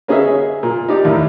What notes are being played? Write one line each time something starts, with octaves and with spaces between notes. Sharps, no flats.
A#3 C#4 G#4 B4 D#5 E5
G#4
A#2
D#4 G4 D5
D#2 A2 D#3